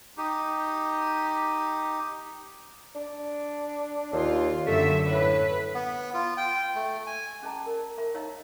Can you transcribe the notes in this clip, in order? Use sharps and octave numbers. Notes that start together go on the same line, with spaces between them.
D#4 G4
D4
D#2 F4
F#2 D3 A3 E5
A2 B4
B3
F4
G5
A3
G#5
C#4 G#4 D#5 A5 A#5
A#4
A#4 E5 B5
D#4 C#5 D#5 F5 A#5 E6